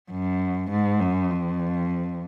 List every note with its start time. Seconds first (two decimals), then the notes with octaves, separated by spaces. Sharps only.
0.11 F#2
0.71 G#2
1.00 F#2
1.30 F2